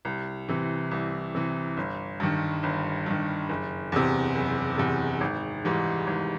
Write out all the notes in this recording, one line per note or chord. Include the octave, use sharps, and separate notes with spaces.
C2
C3 E3
C2
C3 E3
G1
G2 D#3
G1
G2 D#3
F#1
E2 C3
F#1
E2 C3
G#1
G#2 E3 G3
G#1